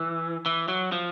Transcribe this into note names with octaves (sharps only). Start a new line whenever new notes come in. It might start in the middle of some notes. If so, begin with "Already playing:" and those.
Already playing: E3
E3
F#3
F3